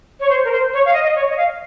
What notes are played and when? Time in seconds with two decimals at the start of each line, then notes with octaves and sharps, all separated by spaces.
0.20 C#5
0.30 C5
0.44 A#4
0.52 C5
0.73 C#5
0.85 F5
0.93 D#5
1.04 D#5
1.15 C#5
1.30 D#5
1.37 F5